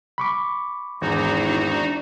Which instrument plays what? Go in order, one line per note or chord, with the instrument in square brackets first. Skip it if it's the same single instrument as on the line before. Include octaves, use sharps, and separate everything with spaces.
[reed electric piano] B5 C#6 D6
[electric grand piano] G#1 E2 [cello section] E3 D4 [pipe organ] D#4 F#4